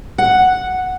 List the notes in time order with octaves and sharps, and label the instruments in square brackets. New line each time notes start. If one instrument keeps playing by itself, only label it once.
[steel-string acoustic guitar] F#5